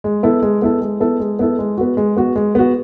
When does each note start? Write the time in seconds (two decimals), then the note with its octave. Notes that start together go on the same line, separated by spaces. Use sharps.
0.04 G#3
0.23 B3 E4 A4
0.42 G#3
0.62 B3 E4 A4
0.81 G#3
1.00 B3 E4 A4
1.20 G#3
1.39 B3 E4 A4
1.59 G#3
1.77 B3 F#4
1.97 G#3
2.17 B3 F#4
2.36 G#3
2.55 B3 F#4